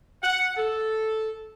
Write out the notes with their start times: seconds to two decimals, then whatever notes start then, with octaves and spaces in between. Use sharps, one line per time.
0.23 F#5
0.57 A4